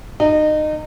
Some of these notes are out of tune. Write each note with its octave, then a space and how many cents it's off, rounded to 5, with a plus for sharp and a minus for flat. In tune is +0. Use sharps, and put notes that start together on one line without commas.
D#4 -25